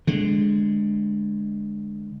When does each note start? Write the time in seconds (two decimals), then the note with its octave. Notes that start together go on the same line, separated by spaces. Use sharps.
0.07 D3 G#3